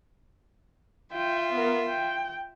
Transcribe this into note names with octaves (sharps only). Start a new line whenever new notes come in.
F4 E5 G5
B3 A#4
G5